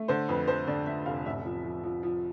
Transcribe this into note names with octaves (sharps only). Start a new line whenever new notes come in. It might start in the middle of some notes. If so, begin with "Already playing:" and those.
Already playing: A3
D3 C5
F2 B4
F2 C5
D3 D5
D3 E5
F1 F5
A1 E5
F3
F3
F3
F3